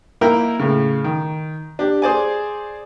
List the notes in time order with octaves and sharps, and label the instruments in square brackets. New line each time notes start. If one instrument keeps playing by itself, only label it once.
[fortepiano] A#3 D#4 E4 A#4 E5 G5
A2 C#3
D#3
D4 G4
G#4 C5 D5 G#5